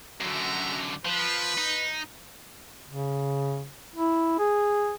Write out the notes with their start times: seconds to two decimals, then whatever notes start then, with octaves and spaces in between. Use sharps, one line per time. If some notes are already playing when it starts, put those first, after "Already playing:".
0.21 F#2 D3 F#4 E5 A#5
1.05 F3 B4
1.58 D#4
2.88 C#3
3.96 E4
4.39 G#4